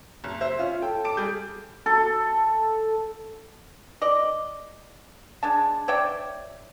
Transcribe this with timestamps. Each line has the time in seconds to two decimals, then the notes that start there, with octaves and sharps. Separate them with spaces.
0.24 F#1
0.41 C5 E5
0.59 C#4 F4
0.82 A4 G5
1.04 A5 D6 D7
1.17 G3 G#4 G6
1.86 A4
4.02 D5 D#5
5.43 G#3 D4 A5
5.88 C#5 D5 E5 G5